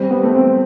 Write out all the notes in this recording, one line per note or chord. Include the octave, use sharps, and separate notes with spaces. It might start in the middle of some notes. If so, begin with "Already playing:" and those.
Already playing: G3 C4
B3
A3
C4